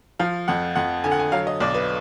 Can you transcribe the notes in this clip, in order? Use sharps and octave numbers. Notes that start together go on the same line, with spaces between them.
F3 F5
F2 F#5
F2 F#5
D3 G#5
F#5
G#5
F#3 F5
D#5
B1 D5
B4